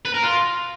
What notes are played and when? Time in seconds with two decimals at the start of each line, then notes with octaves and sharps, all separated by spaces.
0.05 B4
0.14 A#4
0.23 F4